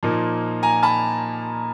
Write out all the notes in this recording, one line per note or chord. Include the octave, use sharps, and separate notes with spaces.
A#2 F3 A#3 D#4
G#5 A#5
A5 B5